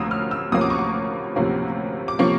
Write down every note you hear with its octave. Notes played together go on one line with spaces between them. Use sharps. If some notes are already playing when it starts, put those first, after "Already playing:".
Already playing: D2 C3 F3 A#3 C#4 D#6 E6
F6
E6
D2 C3 F3 A#3 C#4 D#6
D6
C#6
D6
D2 C3 F3 A#3 C#4
D6
C3 F3 A#3 C#4 C#6